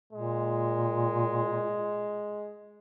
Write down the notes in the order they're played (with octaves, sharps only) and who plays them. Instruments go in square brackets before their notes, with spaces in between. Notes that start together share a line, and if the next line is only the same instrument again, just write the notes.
[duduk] A#2 [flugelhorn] G#3